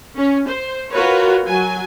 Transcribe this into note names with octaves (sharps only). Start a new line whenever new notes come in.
C#4
C5
F4 F#4 A#4 B4 C#5
F#3 G#5